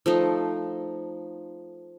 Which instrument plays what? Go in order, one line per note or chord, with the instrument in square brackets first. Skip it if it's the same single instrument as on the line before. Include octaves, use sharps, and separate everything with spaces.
[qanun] F3 A3 D#4